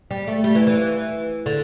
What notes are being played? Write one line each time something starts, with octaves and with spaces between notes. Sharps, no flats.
G3
A3
G3
E3
E3
D3